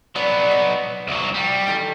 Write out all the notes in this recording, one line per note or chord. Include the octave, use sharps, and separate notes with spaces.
F#3 B3 D5
D#5
C2 F#3
G3
D#3 E3 A4